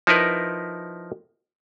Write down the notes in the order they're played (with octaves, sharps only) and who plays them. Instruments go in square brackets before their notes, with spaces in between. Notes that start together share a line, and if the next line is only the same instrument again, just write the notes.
[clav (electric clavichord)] F3 D#4 E4 A#4 B4